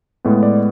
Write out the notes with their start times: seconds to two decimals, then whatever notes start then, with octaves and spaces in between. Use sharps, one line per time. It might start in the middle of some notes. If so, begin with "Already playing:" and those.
0.25 A2 G#3 B3
0.43 D5